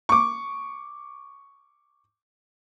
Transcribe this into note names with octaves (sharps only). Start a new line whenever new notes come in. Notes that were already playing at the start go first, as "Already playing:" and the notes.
C#6 D6